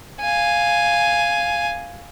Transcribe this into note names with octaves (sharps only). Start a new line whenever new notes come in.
F5 G#5